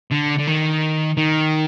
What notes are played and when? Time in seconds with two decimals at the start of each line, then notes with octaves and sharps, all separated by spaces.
0.12 D3
0.39 D3
0.47 D#3
1.17 D#3